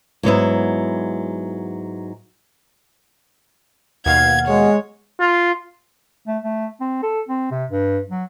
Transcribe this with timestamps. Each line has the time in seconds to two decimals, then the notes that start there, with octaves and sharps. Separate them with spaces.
0.23 G#2 F#3 B3 E4
4.06 D#2 B2 F5 F#5 G#6
4.48 G#3 C#5
5.20 F4
6.27 A3
6.43 A3
6.81 C4
7.03 A4
7.29 C4
7.51 C3
7.71 G2
8.10 F#3